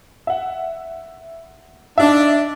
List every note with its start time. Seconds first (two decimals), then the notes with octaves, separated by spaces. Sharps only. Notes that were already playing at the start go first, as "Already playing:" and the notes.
0.27 E5 F#5
1.98 D4 D#4 E5